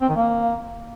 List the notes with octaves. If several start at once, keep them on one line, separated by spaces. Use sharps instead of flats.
C4
D#3
A#3